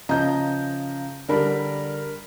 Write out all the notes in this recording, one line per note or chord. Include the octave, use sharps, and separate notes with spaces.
C#3 F3 D#5 A#5 G6
D3 G3 D4 A#4 B5